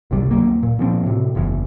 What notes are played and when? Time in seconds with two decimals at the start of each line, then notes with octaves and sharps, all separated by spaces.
0.11 G1 C2 C3 G3
0.31 D#2 F#3 A#3
0.63 A#2
0.79 A#2 F3 C4
1.03 A2 C3
1.35 F#1 E2